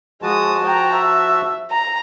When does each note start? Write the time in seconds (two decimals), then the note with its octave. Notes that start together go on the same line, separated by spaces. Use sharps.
0.22 F3 G#3 F#4 A5 D#6
0.64 G5 A#5
0.96 E5
1.71 A#5